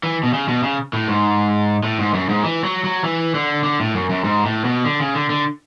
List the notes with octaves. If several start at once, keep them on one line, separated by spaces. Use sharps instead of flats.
E3
B2
C#3
B2
C#3
A2
G#2
A2
G#2
F#2
G#2
E3
F#3
F#3
E3
D3
D3
A2
F#2
F#2
G#2
A2
B2
D3
C#3
D3
D3